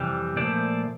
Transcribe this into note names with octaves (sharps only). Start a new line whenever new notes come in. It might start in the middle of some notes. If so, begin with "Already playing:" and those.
Already playing: F2 C3 E3 G3
A#2 F3 A3 C5 D5